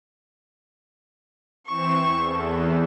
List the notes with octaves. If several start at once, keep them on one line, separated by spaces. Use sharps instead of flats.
E3 C4 C#6 E7
E2
A4